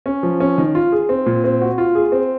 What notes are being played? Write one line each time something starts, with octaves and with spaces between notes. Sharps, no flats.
C#4
F3
C#4
D#3
F4
G#4
C4
A#2
C4
F#4
F4
G#4
C4